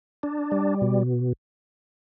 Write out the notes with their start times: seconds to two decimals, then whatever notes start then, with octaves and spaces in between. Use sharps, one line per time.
0.23 D4
0.52 G3
0.81 B2